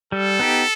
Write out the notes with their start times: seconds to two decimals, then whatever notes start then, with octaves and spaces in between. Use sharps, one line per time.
0.12 G3 A4
0.39 B3 D#4 G4